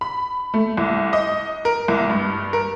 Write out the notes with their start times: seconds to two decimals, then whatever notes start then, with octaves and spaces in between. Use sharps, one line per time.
0.01 B5
0.54 A3
0.77 C2
1.13 D#5
1.65 A#4
1.88 C2
2.10 G2
2.53 A#4